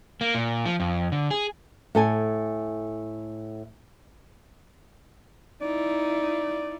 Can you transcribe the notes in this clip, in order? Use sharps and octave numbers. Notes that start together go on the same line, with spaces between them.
A#3
A#2
F3
F2
D3
G#4
A2 A4 G#5
D#4 E4 D5